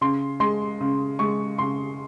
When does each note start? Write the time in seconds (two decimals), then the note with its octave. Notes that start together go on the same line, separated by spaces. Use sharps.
0.01 C#3 C6
0.40 G#3 C6
0.81 C#3
1.19 G#3 C#6
1.58 C#3 C6